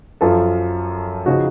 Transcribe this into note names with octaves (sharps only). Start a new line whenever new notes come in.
F#2 F3 F4 A4
C#3 F3 D#4 F#4